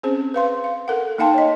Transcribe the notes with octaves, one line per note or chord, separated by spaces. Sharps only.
C4 C#4 G#4 C5
B4 F5 C6
F5
A4 A#4 F#5
A#3 D#4 F5 G5 A5 C6
C#5 D#5